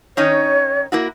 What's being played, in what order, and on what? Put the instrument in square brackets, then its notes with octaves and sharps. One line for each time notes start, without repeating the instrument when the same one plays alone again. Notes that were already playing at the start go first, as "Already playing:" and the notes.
[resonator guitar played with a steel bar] D#3 C#4 D#4 [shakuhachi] C#5
[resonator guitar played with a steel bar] A#3 E4 F#4